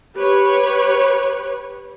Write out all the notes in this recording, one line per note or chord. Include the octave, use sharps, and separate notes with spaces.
G4 B4 C#5